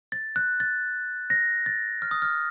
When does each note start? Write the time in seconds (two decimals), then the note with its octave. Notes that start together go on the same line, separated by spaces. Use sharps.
0.12 A6
0.36 F#6
0.60 A6
1.30 A#6
1.66 A6
2.02 F6
2.11 D#6
2.22 F6